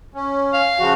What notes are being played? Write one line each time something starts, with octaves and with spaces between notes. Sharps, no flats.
C#4
F5
C#3 F3 F#4